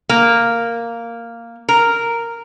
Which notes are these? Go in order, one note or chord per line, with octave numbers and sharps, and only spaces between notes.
A#3
A#4